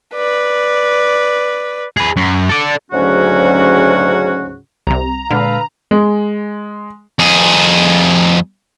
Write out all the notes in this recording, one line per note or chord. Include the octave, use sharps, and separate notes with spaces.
B4 D5
G#4 B4
F#2
A4 D5
D2 G#2 C#3 F#3 C#4 F#4
C2 C3 A#5
A#2 D3 G#3 A4 B4 F5
G#3
F2 G#4